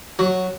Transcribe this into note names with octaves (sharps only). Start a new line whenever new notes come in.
F#3 F#4